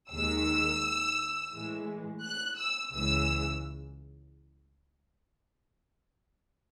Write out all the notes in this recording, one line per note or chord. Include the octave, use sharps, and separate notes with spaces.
D#2 D#3 G#3 E6
A2 E3 G#3
F#6
E6
C#2 C#3 E3 G#3 E6